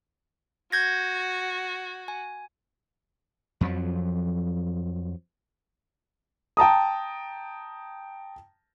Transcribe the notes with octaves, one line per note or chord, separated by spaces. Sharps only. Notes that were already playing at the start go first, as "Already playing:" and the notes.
F#4 G6 G#6 A#6
G#5
F2 F3 F#3
G5 A5 A#5 D#6